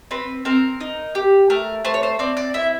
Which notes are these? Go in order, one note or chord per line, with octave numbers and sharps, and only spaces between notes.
C4 B4
C4 A#4
D#4
G4
A3 A#4
A3 C5
C#5
C5
C4 D5
D5
E4 E5